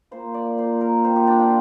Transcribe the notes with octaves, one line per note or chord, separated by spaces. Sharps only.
A#2 A#3 C5
D5
A#2 A#3 C5
A#4
A#2 G3 C4 C5
G4
D4
F4